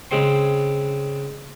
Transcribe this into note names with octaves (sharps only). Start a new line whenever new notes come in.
C#3 G#3 C4 C6